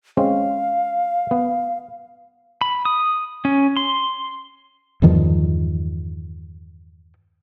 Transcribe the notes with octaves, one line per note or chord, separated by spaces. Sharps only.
G#3 C4 C#4 F5
B3
B5
D#6
C#4
C6
E2 G2 D#3 F3